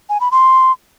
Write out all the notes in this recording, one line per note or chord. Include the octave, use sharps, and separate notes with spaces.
G#5
B5
C6